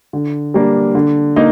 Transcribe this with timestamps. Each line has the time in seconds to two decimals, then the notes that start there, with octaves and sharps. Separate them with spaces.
0.13 D3
0.54 G3 A#3 D4
0.95 D3
1.36 A#3 D#4